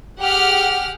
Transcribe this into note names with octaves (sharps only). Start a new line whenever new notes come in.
G4 G#4 F#5 F6